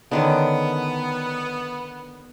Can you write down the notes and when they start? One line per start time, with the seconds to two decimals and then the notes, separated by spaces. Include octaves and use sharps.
0.11 D3 D#3 B3 C#4